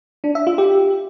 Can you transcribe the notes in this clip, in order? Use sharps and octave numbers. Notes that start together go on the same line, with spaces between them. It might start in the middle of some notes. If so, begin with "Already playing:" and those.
D4
E5
F4
G4